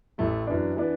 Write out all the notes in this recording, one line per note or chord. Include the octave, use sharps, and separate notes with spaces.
A1 A2 A3 E4
F#2 E3 B3 D4
E3 B3 D4